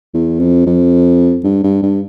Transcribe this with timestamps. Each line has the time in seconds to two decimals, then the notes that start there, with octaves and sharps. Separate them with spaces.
0.14 E2
0.40 F2
0.67 F2
1.44 G2
1.63 G2
1.83 G2